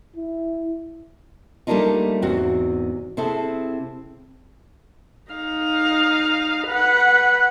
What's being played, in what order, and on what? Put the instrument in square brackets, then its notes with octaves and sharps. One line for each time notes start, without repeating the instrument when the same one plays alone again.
[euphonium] E4
[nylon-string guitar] G3 A3 A#3 D4 D#4 F4
E2 G#2 C3 C4 F#4
C3 C4 E4 G#4 A4
[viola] D#4 F5
B4 F#5